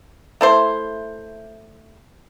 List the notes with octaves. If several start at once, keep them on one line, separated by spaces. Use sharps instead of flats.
A3 E4 C5